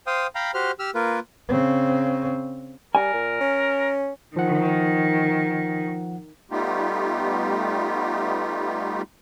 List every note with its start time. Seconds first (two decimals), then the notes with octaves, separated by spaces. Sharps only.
0.07 C5 F5 G5 D#6
0.35 F5 G5 A#5 B5
0.54 F#4 G4 C5 F6
0.79 G4 E6 F6
0.95 A#3 F4 A#4 B4
1.49 C#3 C4
2.95 G3 A#4 G#5
3.13 A#2
3.40 C#4
4.36 D#3 F3 F#5
6.51 G3 A3 B3 D#4 F4 G4